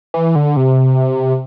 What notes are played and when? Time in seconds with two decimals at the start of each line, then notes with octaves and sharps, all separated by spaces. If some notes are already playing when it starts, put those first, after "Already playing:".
0.14 E3
0.35 D3
0.57 C3